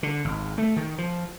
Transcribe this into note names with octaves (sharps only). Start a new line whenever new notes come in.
D3
G#1
A3
D#3
F3